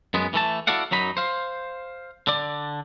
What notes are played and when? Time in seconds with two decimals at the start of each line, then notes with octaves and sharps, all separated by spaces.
0.14 F#2 G#3 B3
0.34 E3 A3 A5
0.67 E4 F#4 A4 D5 F5 F#5
0.91 F#2 F#3 D#4 B5
1.17 C5 F5
2.27 D3 D5